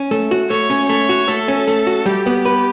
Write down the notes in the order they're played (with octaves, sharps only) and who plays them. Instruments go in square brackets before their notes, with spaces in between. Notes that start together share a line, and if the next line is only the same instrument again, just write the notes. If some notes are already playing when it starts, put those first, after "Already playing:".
Already playing: [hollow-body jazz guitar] C#4
A3
F#4
[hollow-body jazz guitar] A3 [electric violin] C#5
[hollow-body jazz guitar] C#4
[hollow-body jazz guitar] A3 [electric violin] C#5
[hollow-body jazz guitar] F#4
[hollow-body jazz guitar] A3 [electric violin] A4
[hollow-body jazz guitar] C#4
A3
F#4
[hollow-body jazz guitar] G3 [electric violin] G4
[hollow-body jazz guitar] B3
B4